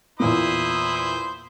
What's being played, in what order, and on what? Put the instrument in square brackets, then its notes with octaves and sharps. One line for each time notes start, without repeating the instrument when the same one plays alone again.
[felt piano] E2 A#2 A#3 [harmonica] E4 C5 D#6